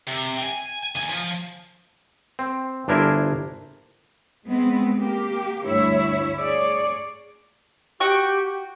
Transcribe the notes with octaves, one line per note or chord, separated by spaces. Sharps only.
C3
G#5
D#2 G#5
F3
C4
G1 D4 E4 A#4 C5 G#5
G#3 B3 C4
A#3 G4
D2 G2 E4 C#5 E5
G#4 C#5 D5
F#4 G4 G5 C#6